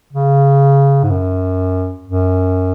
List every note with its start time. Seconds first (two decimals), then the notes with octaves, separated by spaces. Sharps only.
0.13 C#3
1.03 G#2
1.10 F#2
2.08 F#2